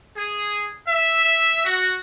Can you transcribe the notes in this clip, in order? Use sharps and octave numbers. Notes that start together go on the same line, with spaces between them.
G#4
E5
F#4